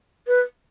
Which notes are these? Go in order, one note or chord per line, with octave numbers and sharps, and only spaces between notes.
B4